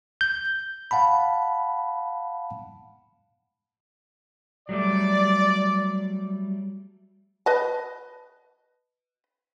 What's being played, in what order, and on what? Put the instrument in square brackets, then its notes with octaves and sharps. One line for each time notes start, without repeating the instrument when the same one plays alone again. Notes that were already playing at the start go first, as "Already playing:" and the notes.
[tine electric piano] G6
F5 F#5 A5 B5
[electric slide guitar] F#3 G3 A3 [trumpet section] D5
[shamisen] B4 D#5 A5